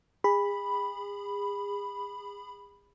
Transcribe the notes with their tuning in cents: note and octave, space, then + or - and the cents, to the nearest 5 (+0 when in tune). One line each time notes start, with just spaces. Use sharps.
G#4 -35 B5 +0